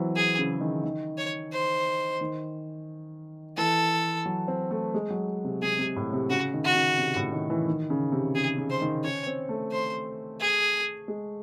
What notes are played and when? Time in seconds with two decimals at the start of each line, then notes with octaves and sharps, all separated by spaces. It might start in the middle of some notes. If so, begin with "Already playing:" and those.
Already playing: E3 F#3 C4
0.16 G#4
0.39 C#3
0.61 D#3
0.83 D#3
1.18 C#5
1.53 C5
2.21 D#3
3.57 E3 A4
4.26 F#3
4.48 C4
4.71 A3
4.94 G#3
5.10 F#3
5.44 C3
5.62 C3 G#4
5.79 C3
5.96 A2
6.13 C3
6.30 C#3 F#4
6.54 D#3
6.64 F#4
6.75 C#3
6.98 C3
7.16 A2
7.33 D#3
7.50 E3
7.67 D#3
7.90 C#3
8.12 C3
8.35 C#3 G#4
8.58 C#3
8.70 C5
8.82 D#3
9.04 C#4 C#5
9.27 C4
9.49 A3
9.72 C5
10.40 G#4
11.08 G#3